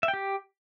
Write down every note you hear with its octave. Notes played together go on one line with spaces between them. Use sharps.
E5
G5
G4